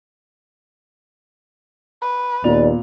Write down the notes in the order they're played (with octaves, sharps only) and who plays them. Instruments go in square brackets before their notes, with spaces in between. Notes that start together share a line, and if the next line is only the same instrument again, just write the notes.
[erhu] B4
[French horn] D#2 [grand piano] A#2 B3 F7 [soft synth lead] D5